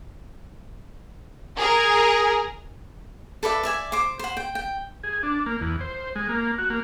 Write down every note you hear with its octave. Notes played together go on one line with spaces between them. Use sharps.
G#4 A#4
A4 B4 D5 E5
D5 E5 G#5
C5 D6
C5 F#5
G5
G5
G#4
D4
A#3
E2
C5
G#3
A#3
F#4
A#3